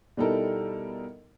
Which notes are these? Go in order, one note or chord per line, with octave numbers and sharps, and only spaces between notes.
B2 G3 D#4 E4 A4 A#4